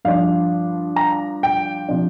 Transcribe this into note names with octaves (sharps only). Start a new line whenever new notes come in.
G2 F3 D4 F4 F5
A#5
G5
C3 F3 D4